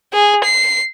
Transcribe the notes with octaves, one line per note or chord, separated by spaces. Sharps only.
G#4
C7